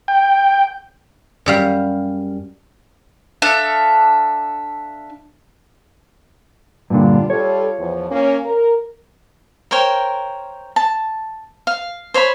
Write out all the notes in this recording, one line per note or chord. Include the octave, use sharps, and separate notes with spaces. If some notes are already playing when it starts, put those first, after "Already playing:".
G5
F#2 G3 F5
D4 A4 E5 F5
G2 A#2 D3 G3 D4 F4
G3 F4 A4 C#5
E2 F3
A#3 C#4
A#4
A#4 C5 C#5 G5
A5
F5
C5 C#5 E5 B5